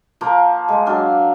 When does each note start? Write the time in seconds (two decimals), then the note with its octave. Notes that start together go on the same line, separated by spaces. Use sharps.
0.21 F3 A#3
0.68 G#3
0.86 F#3 D4 F5